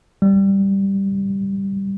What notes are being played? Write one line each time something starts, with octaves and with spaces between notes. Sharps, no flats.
G3